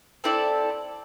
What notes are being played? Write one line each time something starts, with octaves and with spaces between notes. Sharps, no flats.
C4 E4 A4 D5